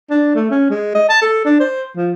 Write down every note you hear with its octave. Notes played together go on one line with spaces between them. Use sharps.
D4
A3
C#4
G#3
D#5
A5
A4
D4
C5
F3